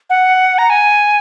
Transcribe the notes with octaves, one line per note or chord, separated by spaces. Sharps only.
F#5
A#5
G#5